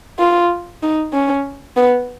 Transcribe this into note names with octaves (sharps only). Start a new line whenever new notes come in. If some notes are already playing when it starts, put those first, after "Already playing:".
F4
D#4
C#4
B3